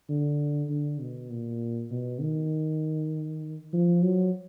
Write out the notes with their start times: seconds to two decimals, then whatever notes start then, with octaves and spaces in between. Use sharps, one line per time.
0.09 D3
0.70 D3
1.00 B2
1.31 A#2
1.91 B2
2.21 D#3
3.73 F3
4.03 F#3